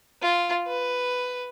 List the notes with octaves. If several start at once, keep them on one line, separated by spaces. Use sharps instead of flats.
F4
B4